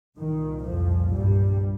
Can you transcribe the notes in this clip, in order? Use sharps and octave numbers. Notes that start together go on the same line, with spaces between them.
C2 A#2 D#3
F2 F3
G2 G3